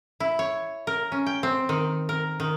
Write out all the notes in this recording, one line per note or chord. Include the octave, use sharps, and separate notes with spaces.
E4
C#5
A#4
C#4
G5
C4
D#3
A#4
D#3